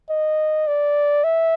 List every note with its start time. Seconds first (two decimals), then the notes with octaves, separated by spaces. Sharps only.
0.10 D#5
0.67 D5
1.24 E5